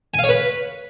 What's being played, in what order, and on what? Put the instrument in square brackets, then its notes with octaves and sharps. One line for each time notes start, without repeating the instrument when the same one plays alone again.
[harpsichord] G#5
F5
C#5
B4